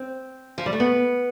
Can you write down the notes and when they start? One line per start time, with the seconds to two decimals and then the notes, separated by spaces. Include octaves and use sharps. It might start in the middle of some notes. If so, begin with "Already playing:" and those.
Already playing: C4
0.58 F3
0.66 G3
0.73 A3
0.80 B3